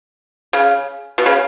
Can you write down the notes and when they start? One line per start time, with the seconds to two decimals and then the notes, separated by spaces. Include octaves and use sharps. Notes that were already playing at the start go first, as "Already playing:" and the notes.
0.53 C#3
1.18 B2
1.26 C#3